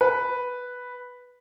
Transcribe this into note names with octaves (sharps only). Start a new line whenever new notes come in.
B4